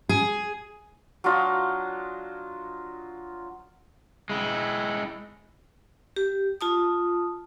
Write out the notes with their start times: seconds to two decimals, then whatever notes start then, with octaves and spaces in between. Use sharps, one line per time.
0.09 G#4
1.24 F#3 D4 F4 D#5
4.30 G#3 E4
6.16 G4
6.61 F4 A5 D#6